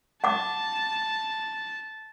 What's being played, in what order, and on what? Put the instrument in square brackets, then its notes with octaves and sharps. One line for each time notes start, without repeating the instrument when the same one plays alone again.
[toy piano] F#5 D6 [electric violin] A5